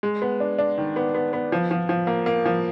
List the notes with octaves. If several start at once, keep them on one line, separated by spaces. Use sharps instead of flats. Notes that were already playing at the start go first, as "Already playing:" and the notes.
G#3
B3
D4
D4
D#3
B3
B3
B3
F3
F3
F3
A#3
A#3
F3